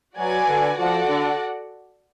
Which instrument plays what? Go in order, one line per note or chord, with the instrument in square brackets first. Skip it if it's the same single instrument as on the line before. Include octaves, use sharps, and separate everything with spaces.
[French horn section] F#3 [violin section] F#4 B4 D5 G#5
[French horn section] D3
[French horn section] F3 [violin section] F#4 A4 D5 F#5
[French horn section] D3